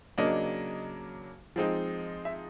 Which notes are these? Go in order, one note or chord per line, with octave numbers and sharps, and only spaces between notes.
C#3 F#3 A#3 D4 D#5
F3 G#3 C4 D#4
E5